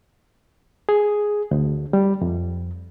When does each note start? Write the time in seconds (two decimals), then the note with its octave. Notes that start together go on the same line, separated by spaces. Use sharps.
0.89 G#4
1.51 D2
1.93 G3
2.21 F2